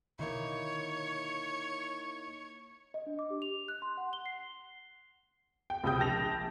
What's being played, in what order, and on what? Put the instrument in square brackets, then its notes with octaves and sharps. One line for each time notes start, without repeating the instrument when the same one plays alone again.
[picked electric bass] B2 D3 D#3 [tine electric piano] A#3 D#4 E4 [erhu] C#5
[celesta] D#5
D4
D6
G4
F7
F#6
C6
F#5
G7
C7
[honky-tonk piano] G5
C#2 C3 G5 D#6 G6
A#1 G5 A5 A#6 F7